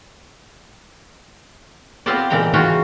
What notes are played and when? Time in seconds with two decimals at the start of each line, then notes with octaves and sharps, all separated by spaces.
2.06 B3 C4 F4 G4 C5 D5
2.30 A#2 C#3 E3 G#3 G5 A#5
2.53 E3 F4 F#4 F#5 G5 A#5